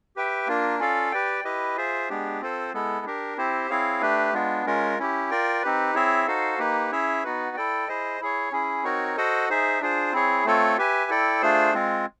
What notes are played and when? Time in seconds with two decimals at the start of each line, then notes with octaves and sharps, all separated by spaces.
0.16 G4 B4 E5 G5
0.47 A#3 D4 F4 A#4
0.79 C#4 F4 A4 D5 F5
1.12 G4 B4 D5 G5
1.45 E4 G4 B4 D#5
1.77 F4 G#4 C5 E5
2.09 G#3 B3 D4 G4
2.41 C4 F4 A4 C5
2.74 G#3 B3 E4 A4
3.06 D4 G4 A#4
3.37 C4 E4 G4 C5
3.70 C4 E4 G#4 C#5 F5
4.01 A3 D4 G4 B4
4.34 G#3 B3 D4 F4
4.66 G#3 C#4 F4 A#4
4.99 C#4 E4 G4
5.30 F4 A#4 D5 G5
5.62 C4 D#4 G4 B4
5.94 C4 E4 G#4 C#5 E5
6.27 D#4 F#4 A4 C5 F5
6.59 A#3 D#4 G4 B4
6.91 C#4 E4 G#4 C#5 E5
7.24 B3 D#4 F#4 B4
7.56 E4 A4 D5 G5
7.88 E4 G#4 C5 D#5
8.21 E4 G#4 C#5
8.52 C#4 E4 G#4
8.84 C4 D#4 F#4 A#4 C#5
9.17 F#4 A4 C5 D#5 F#5
9.49 D#4 G#4 C5 E5
9.80 D4 F4 G#4 C5
10.13 C4 E4 G#4 C#5
10.45 A3 C4 F4 A4 C#5
10.78 G4 B4 E5 G#5
11.09 E4 A4 D5 G5
11.42 A3 D4 F4 G#4 C5
11.74 G#3 C4 F4